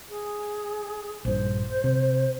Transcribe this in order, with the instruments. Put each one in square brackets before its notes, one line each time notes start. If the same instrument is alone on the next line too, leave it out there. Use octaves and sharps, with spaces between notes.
[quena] G#4
[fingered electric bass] A#1 G2 [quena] C5
[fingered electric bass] C3